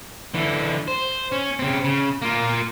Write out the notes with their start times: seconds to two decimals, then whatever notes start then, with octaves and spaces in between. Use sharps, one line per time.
0.34 D3 E3
0.88 C5
1.32 C#4
1.59 C#3 C4
1.84 C#3
2.22 A#3 F4